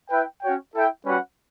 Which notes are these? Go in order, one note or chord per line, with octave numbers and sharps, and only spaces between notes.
E4 B4 E5 G5
C#4 F#4 C#5 G5
E4 A4 E5 G5
G3 C#4 F#4 B4 F#5